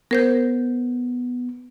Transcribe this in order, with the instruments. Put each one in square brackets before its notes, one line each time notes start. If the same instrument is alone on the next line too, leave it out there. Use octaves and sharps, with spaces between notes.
[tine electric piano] B3 [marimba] A#4 C5 G6